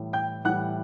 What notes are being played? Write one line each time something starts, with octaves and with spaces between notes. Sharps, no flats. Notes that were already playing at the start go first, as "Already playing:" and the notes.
Already playing: A2 E3 G3
G5 G6
A2 E3 G3 F#5 F#6